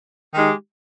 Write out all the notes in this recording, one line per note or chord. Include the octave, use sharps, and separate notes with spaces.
D#3 G#3 D#4 G4